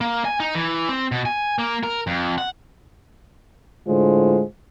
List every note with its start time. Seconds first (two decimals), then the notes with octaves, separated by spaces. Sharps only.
0.01 A#3
0.25 G#5
0.40 D#4
0.55 E3
0.89 C4
1.12 B2
1.26 G#5
1.59 A#3
1.83 A#4
2.07 F2
2.38 F#5
3.88 A2 D3 G#3 F4 C5